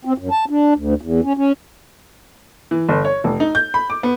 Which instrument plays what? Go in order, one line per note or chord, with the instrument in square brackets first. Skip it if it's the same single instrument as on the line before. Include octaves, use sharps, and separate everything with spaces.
[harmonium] C4
F#2
A5
D4
D2
E2
C#4
C#4
[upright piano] E3
G1
C#5
F1
D#4
G6
B5
D6
B3